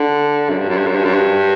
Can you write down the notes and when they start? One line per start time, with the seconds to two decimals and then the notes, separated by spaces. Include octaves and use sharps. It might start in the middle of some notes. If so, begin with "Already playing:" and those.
Already playing: D3
0.50 F#2
0.59 G2
0.69 F#2
0.77 G2
0.87 F#2
0.96 G2
1.05 F#2
1.14 G2